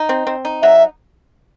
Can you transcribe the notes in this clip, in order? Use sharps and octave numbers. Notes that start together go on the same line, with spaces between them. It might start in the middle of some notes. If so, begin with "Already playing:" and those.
Already playing: D#4
C4
C4
D#4
F#3 E5